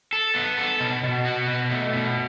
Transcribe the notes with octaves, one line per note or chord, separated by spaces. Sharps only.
A4
B3
A4
B2
B2
F#4
B2
A3
B2